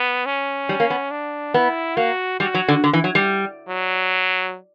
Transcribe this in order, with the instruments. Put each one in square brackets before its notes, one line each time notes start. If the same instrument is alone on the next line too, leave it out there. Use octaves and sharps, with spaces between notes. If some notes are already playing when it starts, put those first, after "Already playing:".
Already playing: [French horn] B3
C#4
[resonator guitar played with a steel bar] G3
A#3
B3
[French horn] D4
[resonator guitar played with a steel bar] B3 [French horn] E4
[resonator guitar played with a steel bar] A#3 [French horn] F#4
[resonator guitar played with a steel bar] G3 [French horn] F#4
[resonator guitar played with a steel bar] F#3
D3
D3
E3
F#3
G3
[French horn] F#3